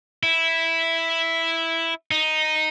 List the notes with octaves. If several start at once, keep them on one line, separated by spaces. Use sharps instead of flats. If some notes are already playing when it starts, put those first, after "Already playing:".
E4
D#4